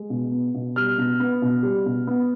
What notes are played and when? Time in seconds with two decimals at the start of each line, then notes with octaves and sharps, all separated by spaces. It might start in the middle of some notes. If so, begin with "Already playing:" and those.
Already playing: G#3
0.10 B2
0.32 B3
0.54 B2
0.76 G3 F6
0.98 B2
1.20 B3
1.42 B2
1.63 G3
1.86 B2
2.07 B3